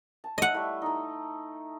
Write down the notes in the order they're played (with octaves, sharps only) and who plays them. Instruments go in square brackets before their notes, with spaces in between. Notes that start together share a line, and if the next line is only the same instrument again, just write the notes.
[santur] A5
[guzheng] D#5 F#5 [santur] E5
[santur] G3 A3 E4
D#4 A4